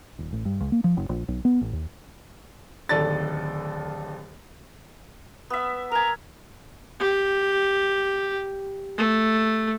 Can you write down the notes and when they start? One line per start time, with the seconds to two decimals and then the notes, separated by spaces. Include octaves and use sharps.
0.19 D#1
0.33 A1
0.45 G2
0.61 C#2
0.72 A#3
0.84 F3
0.97 F#1
1.09 A#1
1.28 B1
1.45 B3
1.61 A1
1.73 D#2
2.89 D1 D#2 A4 D5 A6
5.50 B3 E5
5.91 A#4 G#5 A#5
7.00 G4
8.98 A3